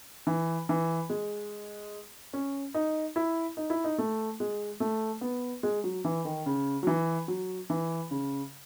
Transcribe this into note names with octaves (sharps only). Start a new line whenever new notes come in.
E3
E3
G#3
C#4
D#4
E4
D#4
E4
D#4
A3
G#3
A3
B3
G#3
F#3
E3
D#3
C#3
F#3
E3
F#3
E3
C#3